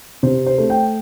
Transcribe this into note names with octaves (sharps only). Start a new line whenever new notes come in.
C3 C5
C5
A3
G5